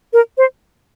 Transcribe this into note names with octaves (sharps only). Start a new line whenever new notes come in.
A#4
C5